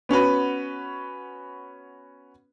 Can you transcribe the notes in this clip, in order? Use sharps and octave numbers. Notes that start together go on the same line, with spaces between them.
B3 C#4 F#4 B4